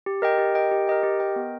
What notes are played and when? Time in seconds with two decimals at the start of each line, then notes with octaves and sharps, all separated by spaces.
0.06 G4
0.22 A#4 D#5 G5
0.38 G4
0.55 A#4 D#5 G5
0.71 G4
0.87 A#4 D#5 G5
1.03 G4
1.20 A#4 D#5 G5
1.36 B3